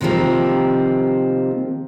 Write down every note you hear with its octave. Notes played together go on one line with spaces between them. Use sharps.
C3 D#3 F3 G3 A#3 C4